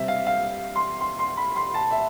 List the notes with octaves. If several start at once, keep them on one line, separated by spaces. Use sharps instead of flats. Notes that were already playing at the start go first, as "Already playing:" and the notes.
Already playing: C3 G3 C4 E5
F5
F5
C6
C6
C6
B5
C6
A5
E5